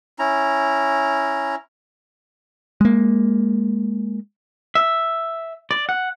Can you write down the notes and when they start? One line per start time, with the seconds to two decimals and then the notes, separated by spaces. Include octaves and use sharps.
0.19 C#4 E4 A#5
2.81 G#3 A#3
4.75 E5
5.71 D5
5.89 F#5